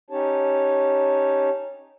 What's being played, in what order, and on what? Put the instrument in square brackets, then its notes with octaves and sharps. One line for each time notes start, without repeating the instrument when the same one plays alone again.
[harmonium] C#4 D#4 G4 C#5 A5